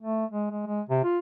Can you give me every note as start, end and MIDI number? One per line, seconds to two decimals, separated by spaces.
0.02 0.25 57
0.31 0.48 56
0.51 0.65 56
0.67 0.81 56
0.89 1.01 48
1.04 1.19 65